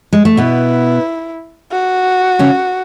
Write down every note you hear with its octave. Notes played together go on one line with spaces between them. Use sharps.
G#3
A3
B2 B3 E4
F#4
C#3 C#4